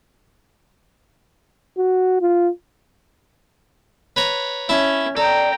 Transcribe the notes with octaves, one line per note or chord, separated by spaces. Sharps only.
F#4
F4
B4 C#5 A#5
C#4 E4 A5
A4 D5 G5 A#5